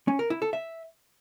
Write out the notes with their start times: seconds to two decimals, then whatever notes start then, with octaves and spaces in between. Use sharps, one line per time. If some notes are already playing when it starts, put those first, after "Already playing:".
0.08 C#4
0.19 A#4
0.30 E4
0.42 A4
0.53 E5